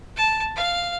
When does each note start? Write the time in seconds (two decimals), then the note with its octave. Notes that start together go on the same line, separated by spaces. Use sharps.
0.16 A5
0.56 F5